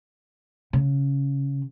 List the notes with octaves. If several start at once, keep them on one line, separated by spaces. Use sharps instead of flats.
C#3